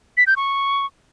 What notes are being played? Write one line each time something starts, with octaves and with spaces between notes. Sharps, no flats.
B6
G6
C#6